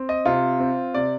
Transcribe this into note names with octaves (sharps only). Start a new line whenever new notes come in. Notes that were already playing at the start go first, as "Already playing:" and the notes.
Already playing: C4
D#5
C3 F4
C4
C3 D5